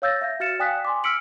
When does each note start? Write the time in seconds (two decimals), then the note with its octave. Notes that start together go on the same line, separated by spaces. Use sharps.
0.02 C#5 F5 E6 G6 A6 A#6
0.21 E5 F5 A#6
0.40 F#4 F5 F6 A6 C#7 E7
0.59 D5 G5 G#5 D#6 F#6 B6
0.85 G#5 C6 D6
1.04 E6 F6 B6 C#7 D7 F#7